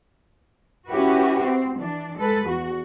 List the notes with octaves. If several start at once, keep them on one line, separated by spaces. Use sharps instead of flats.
C#4 E4 F#4 G4 B4
C4
E3 D4
G#3 A4 B4
E2 F#4